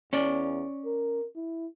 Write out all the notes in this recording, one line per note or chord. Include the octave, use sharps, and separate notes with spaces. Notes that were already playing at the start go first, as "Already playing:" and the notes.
E2 C#4 D5
A#4
E4